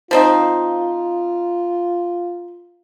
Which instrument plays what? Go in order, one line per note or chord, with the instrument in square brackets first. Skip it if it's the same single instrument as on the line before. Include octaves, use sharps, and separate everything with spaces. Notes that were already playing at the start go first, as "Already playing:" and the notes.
[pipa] F3 C4 D#4 [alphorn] F4